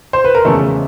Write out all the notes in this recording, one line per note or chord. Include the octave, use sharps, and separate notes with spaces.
C5
B4
A#4
F1 E2 C#3 A3 A4